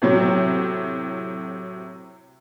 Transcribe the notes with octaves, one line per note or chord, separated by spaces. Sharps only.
A2 C3 F#3